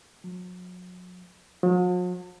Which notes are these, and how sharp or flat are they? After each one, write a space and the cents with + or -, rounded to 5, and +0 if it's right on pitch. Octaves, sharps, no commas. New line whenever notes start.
F#3 -35
F#3 -45